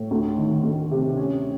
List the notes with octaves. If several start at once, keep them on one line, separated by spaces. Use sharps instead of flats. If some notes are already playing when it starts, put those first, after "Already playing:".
Already playing: A2
D2
D#3
D2
C3
C#4